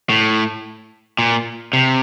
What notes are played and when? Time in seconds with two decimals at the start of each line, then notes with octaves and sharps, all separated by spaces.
0.10 A2
1.19 A#2
1.73 C3